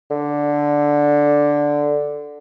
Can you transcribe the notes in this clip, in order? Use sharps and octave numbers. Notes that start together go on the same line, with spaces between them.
D3